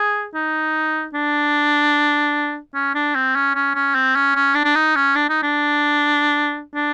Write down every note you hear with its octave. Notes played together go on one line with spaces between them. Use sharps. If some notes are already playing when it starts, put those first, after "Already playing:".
Already playing: G#4
D#4
D4
C#4
D4
C4
C#4
C#4
C#4
C4
C#4
C#4
D4
D4
D#4
C#4
D4
D#4
D4
D4